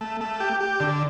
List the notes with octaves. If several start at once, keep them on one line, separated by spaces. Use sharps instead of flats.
A3
A3
G4
G4
D3